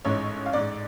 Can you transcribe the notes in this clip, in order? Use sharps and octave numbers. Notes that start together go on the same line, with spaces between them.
A1 G#2 G#3 C#5
F5
A1 G#2 G#3 D5